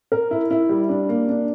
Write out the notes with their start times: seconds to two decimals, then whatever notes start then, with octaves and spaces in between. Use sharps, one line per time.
0.12 A#4
0.31 E4
0.51 E4
0.69 G3
0.89 D4
1.09 A#3
1.29 D4